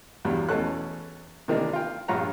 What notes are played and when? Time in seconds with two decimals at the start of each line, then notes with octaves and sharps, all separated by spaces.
0.25 E2 G2 F#3 G3
0.49 E2 B2 A3 C#4 A4 F#6
1.48 C3 D#3 E3 A#3 D4
1.73 F4 G5
2.08 A#1 G2 F4 C#5 F#5 A#5